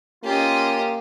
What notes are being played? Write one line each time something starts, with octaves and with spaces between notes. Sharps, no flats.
A#3 C#4 F4 G4 D#5